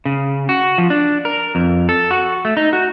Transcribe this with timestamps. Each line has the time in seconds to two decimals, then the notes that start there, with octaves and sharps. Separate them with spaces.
0.05 C#3
0.49 F#4
0.78 F3
0.90 D4
1.25 A#4
1.55 F2
1.89 A4
2.11 F#4
2.45 A3
2.57 D#4
2.73 F#4